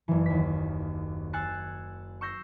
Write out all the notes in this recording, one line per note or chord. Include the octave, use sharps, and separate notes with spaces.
F#1 E3
D#2 B6
G#5 E6 F#6 A6 C7 C#7
C#6 E6 G6 A#6 C7